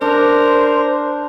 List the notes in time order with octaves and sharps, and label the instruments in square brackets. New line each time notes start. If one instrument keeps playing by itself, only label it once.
[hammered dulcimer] D4 [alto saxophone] A#4 [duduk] C5